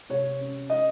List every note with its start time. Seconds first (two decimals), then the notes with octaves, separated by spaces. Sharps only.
0.10 C3 C#5
0.39 C#4
0.70 D#5